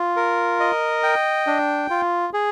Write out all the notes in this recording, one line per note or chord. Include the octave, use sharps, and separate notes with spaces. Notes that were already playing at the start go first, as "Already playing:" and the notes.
Already playing: F4
A#4
D#5
G5
D4
F4
G#4